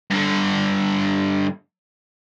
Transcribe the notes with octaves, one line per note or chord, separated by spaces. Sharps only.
G2 D3